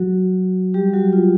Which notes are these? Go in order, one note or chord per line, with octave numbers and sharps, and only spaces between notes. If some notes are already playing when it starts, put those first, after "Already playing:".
Already playing: F#3 F#4
G3 G4
F#3 F#4
F4